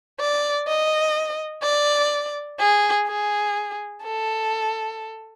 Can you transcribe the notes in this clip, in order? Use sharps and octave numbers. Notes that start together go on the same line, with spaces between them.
D5
D#5
D5
G#4
G#4
A4